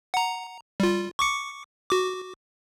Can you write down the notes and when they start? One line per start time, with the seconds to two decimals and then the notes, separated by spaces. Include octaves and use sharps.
0.14 F#5 A#5
0.80 G3 F4
1.19 C#6 D6 C#7
1.90 F#4 D6